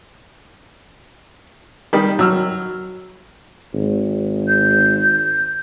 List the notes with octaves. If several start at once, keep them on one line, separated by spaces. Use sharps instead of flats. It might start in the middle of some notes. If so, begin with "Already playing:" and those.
D#3 G3
F#3 E6 F6
G#1
G6